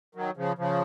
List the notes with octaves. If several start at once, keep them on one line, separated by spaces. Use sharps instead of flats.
D#3 F#3
C#3 F3
C#3 F3